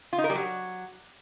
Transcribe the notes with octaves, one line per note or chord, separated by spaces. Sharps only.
F4
D#4
A#4
G3
F#3